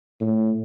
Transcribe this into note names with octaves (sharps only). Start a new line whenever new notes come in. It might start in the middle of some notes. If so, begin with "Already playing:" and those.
A2